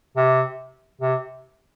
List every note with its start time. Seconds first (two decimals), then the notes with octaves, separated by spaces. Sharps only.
0.17 C3
1.01 C3